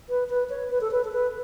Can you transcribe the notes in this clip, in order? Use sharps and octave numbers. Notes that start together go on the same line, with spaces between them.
B4
B4
C#5
B4
A4
B4
A4
B4